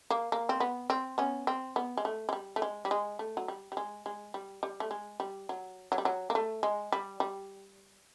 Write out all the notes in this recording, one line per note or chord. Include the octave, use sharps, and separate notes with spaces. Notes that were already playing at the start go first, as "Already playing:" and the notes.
A#3
A#3
C4
B3
C4
B3 C#4
C4
B3
G#3
A3
G#3
G3
A3
G#3
G3
G#3
A3
F#3
G3
G3
G#3
G#3
G3
G3
A3
G#3
G3
F#3
F#3
G3
F#3
A#3
A3
G#3
G3
G3